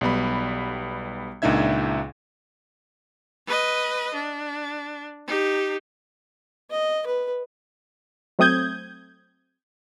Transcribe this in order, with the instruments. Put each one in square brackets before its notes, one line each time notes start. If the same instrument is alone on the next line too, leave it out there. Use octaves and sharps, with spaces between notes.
[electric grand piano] B1 G3 B3 B5
C#2 A#2 D4 D#4 E5 G#6
[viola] B4 D#5
D4
D#4 G4
[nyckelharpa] D#5
B4
[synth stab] F#3 A3 C4 D#6 G6 G#6